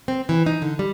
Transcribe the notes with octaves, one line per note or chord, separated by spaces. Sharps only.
C4
E3
D#4
D3
G3